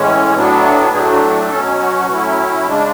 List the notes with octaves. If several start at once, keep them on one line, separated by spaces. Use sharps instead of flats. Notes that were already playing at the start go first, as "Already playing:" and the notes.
Already playing: A2 E3 G#3 C#4
A2 F#3 B3 D4
A2 F#3 A3 D4 G#4
F#4
F#4
B2 F#3 C#4 A4
F#4
A2 F#3 C#4 E4
C#3 G#3 D4